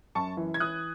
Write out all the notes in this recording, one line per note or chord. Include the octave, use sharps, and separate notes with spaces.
F#2 A5 C#6
E3
G#6
E3 D#6 F#6